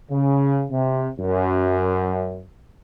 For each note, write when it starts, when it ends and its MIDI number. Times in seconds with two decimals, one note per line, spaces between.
0.10 0.64 49
0.70 1.08 48
1.19 2.42 42